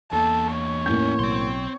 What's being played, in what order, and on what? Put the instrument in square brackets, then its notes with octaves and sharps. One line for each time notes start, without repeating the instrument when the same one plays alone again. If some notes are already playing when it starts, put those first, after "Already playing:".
[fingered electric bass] E2 [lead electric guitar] E3 A#3 [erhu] A4
[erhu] C#5
[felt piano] A1 A#3 G6 [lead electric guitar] C#4 D#4
[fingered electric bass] B1 B2 F#3 [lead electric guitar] C4 C6